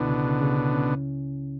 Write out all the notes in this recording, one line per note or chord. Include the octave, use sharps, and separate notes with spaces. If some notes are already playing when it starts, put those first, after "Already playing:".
Already playing: C#2 B2 D3 E4
C#3
C#3
C#3
C#4
C#4